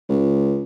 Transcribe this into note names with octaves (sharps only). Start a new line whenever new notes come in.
C#2